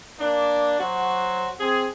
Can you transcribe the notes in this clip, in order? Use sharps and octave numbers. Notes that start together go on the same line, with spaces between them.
A#3 D4
F#3 F#4 C5
C4 G#4